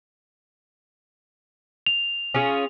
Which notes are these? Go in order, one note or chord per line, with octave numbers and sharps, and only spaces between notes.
F7
C#4 F4 G#4